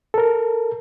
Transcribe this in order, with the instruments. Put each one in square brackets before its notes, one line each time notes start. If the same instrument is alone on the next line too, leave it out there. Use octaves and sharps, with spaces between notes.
[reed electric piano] A4 A#4